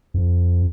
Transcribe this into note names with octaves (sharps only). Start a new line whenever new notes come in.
F2